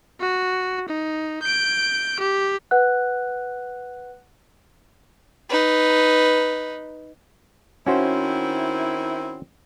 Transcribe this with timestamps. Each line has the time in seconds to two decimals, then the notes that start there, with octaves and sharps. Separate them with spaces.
0.21 F#4
0.88 D#4
1.43 G6 D7
2.20 G4
2.71 B4 F#5 F#6
5.49 D#4 B4
7.87 D#3 C4 C#4 E4 F#4 C5